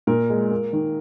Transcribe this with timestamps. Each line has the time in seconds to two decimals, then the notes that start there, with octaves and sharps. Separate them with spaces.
0.07 A#2 A#4
0.30 G#3
0.51 A#3
0.73 D#3